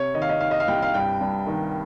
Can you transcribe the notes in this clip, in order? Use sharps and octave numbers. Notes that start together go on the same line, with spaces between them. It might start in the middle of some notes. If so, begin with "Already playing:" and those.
Already playing: C3 C#5
D#3 D#5
F5
D#5
D#3 F5
D#5
F5
C2 G5
F5
G2 G5
G2
D#3